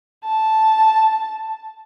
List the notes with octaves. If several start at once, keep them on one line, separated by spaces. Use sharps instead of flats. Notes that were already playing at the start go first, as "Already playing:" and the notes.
A5